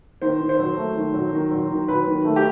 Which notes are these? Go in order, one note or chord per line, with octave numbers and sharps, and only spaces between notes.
D#3 C5
D#3
C5
F#3
A3
D#3
F#3
D#3
F#3
D#3
F#3 B4
D#3
A3
G4